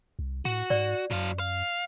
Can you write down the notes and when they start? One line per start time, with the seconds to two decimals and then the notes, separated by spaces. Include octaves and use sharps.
0.19 C2
0.45 A2 F#4
0.70 G#2 D5
1.11 F#2 F#3 F5
1.39 F5